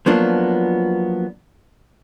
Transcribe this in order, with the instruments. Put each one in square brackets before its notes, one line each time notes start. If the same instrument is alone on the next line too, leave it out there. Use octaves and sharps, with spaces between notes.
[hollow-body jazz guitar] F3 F#3 A#3 B3 D4 F4